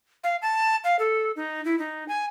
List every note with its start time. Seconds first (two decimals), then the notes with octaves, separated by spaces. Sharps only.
0.24 F5
0.42 A5
0.84 F5
0.99 A4
1.36 D#4
1.65 E4
1.79 D#4
2.08 G#5